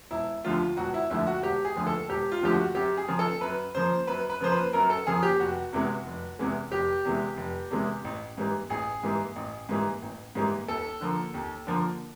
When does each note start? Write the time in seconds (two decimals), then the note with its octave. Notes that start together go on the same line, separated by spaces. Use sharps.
0.11 E1 E4
0.44 D#2 D3 F3 A3 F4
0.77 E1 F#4
0.94 E4
1.10 D#2 D3 F3 A3 E4
1.27 F#4
1.43 E1 G4
1.65 G#4
1.76 D#2 D3 F3 A3
1.87 A4
2.09 E1 G4
2.32 F4
2.42 D#2 D3 F3 A3 G4
2.53 F#4
2.75 F#2 G4
2.97 G#4
3.08 C#3 F3 A#3
3.19 A4
3.41 F#2 B4
3.75 C#3 F3 A#3 C5
4.07 F#2 B4
4.30 B4
4.40 C#3 F3 A#3 C5
4.52 B4
4.73 F#2 A#4
4.90 A4
5.07 C#3 F3 A#3 G#4
5.23 G4
5.40 F1 F#4
5.73 E2 C3 E3 G#3
6.06 F1
6.39 E2 C3 E3 G#3
6.72 F1 G4
7.05 E2 C3 E3 G#3
7.37 F1
7.70 E2 C3 E3 G#3
8.04 A1
8.37 G#2 E3 G3 A#3
8.70 A1 G#4
9.03 G#2 E3 G3 A#3
9.36 A1
9.69 G#2 E3 G3 A#3
10.02 A1
10.35 G#2 E3 G3 A#3
10.68 D#2 A4
11.01 D3 F3 A#3
11.34 D#2
11.67 D3 F3 A#3